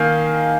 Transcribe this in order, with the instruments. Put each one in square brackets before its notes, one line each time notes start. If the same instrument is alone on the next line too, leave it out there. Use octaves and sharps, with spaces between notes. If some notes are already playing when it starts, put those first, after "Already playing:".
Already playing: [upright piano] D#3 A#3 F5 G#5